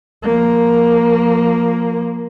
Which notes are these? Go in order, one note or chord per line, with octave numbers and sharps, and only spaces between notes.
F3 A#3